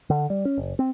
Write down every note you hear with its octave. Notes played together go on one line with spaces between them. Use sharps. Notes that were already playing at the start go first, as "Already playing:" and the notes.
D3
G3
C#4
F#1
C4